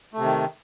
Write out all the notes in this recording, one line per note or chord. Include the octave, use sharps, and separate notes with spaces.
C3 D#3 A3